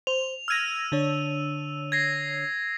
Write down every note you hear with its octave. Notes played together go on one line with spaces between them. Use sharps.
C5 F7
E6 F6 G#6 A#6 D#7
D3 D4 C#5
G#6 A#6 C7